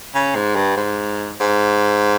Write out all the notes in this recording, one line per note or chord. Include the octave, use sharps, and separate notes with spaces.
C#3
G#2
G2
G#2
G#2